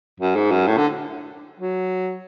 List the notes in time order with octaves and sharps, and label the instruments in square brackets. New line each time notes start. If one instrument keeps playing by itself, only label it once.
[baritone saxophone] F#2
G#2
F#2
A2
D3
F#3